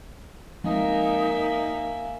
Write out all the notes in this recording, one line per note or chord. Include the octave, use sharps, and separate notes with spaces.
F3 G#3 A#3 C4 D#4 E5 F5 G#5